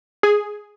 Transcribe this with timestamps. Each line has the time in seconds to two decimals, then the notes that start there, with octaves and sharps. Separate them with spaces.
0.23 G#4